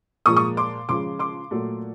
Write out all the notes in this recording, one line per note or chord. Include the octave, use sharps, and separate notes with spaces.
A#2 F3 G#3 C#6 D#6
C#6 D#6
C6 D6
C#3 F3 G#3 C6 D6
C6 D6
A#2 F#3 A3